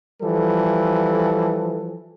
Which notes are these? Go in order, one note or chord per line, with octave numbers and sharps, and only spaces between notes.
E3 F3 G3 A4